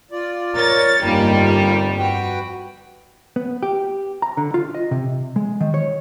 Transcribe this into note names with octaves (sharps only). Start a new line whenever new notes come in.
F4 D5
A#4 C#5 A6
G1 F2 G3 A#3 D#4 F4
F#4 B4 G5
B3
G4
A#5
D3
F4
D#5
C3
G#3
D#3
C#5